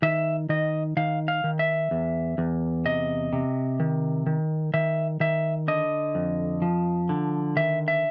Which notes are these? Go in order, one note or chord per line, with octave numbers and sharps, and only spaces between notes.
D#3 E5
D#3 D#5
D#3 F5
F5
D#3
E5
E2
E2
C3 D#5
C3
D#3
D#3
D#3 E5
D#3 E5
D3 D#5
F2
F3
D3
D#3 E5
E5